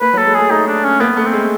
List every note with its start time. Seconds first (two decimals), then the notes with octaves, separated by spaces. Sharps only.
0.01 A#3 B4
0.14 F#3
0.18 A4
0.26 G#3
0.34 A3 G#4
0.51 A3 D#4
0.68 D4
0.84 C#4
1.00 A#3 B3
1.17 A3
1.25 C4
1.33 G#3